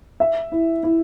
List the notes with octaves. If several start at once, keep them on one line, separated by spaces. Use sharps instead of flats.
E5
E4
E4